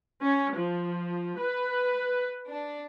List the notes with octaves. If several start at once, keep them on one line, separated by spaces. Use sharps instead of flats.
C#4
F3
B4
D4